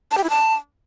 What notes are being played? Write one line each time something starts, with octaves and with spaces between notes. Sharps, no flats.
A5
G4
E4
A5